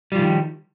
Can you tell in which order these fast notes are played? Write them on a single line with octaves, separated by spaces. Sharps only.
G3 F3 D3 D#3